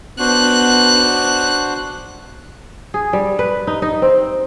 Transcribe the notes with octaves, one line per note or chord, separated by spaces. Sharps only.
B3 D4 F#4 C5 F#6
G#4
G3
B4
D#4
D#4
C4